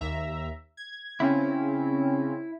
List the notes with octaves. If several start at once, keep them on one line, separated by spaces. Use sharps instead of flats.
D#2 E5 A#5
G#6
C#3 C4 C#4 E4